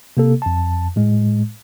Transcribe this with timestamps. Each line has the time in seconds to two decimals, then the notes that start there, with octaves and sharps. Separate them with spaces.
0.17 C3 A#3 A4
0.42 F2 A5
0.96 A2 G#3